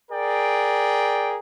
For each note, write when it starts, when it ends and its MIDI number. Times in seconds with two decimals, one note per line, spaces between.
0.10 1.38 68
0.10 1.38 70
0.10 1.38 74
0.10 1.38 79